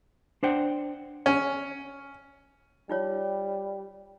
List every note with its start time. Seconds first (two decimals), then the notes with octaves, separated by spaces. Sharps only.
0.43 D4 C5 F#5 G5
1.26 C#4
2.89 G3 D#4 F4 C#5